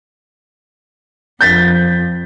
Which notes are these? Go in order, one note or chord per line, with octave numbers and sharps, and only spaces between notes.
F2 G6 A6 B6